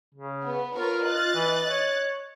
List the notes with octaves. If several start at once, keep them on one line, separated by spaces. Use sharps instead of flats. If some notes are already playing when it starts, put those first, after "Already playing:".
C#3
B3
F4 A#4 B4 C#5
D#5 F#6 A6
E3
C#5